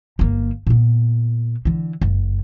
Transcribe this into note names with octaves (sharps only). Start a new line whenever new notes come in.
G1 A#3
A#2 B3
D3 E3
F#1